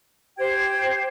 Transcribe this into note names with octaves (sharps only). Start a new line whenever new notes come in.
G4 C5 G5 G#6